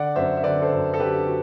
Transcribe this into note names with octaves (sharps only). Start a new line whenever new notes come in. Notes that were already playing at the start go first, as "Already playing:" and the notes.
Already playing: D3 D5 F#5
F#2 C5 E5
E5
D3 B4 D5
A4 C5
F#2
A4
D3 G4 B4
F#4